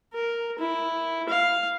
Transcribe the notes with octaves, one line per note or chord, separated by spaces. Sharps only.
A#4
E4
F5